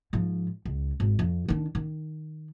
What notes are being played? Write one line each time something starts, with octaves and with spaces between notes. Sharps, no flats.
G#2 F3
C#2
G#1
F2
D#3 D4
D#3